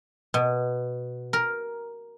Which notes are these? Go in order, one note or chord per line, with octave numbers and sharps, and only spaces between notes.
B2
A#4